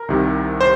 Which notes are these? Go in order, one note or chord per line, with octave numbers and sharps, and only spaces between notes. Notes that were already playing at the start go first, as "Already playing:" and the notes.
Already playing: A#4
C2 C3 D#3
C5